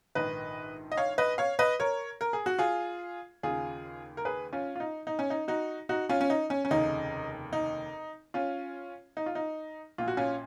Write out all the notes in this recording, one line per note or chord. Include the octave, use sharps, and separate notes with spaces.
A#1 G#2 D#3 B4 D#5
D#5
C#5 F5
B4 D#5
C#5 F5
B4 D#5
A#4 C#5
A#4
G#4
F#4
F4 G#4
D#2 C#3 F4 G#4
A#4
G#4 B4
C#4 F4
F4
D#4
D#4
C#4
D#4
D#4 F#4
D#4 F#4
C#4 F4
C#4
D#4
C#4
C#4
F1 D#2 C#3 D#4
D#4
C#4 F4
D#4
F4
D#4
A#1 A#2 F4
F#4
C#4 F4